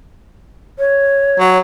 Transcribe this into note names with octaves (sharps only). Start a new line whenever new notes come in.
C#5
F#3